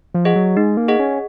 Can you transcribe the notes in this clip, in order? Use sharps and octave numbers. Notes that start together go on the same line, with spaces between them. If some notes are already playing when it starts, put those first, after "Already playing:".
F3
G#4 D#5 F#5
F#3
G#3 D#4
A#3
G#4 D#5 F#5
C#4